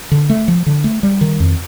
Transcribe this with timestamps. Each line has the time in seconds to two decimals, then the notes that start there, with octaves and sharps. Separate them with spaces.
0.11 D3
0.29 A3
0.48 F3
0.66 D3
0.84 A3
1.03 G3
1.21 D#3
1.40 F2